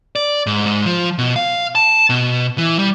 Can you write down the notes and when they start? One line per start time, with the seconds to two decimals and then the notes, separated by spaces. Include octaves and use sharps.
0.16 D5
0.46 G#2
0.66 G#2
0.86 F3
1.18 B2
1.36 F5
1.75 A5
2.10 B2
2.58 E3
2.79 G3